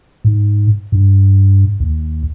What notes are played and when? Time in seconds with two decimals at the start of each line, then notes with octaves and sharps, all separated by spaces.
0.25 G#2
0.92 G2
1.80 D#2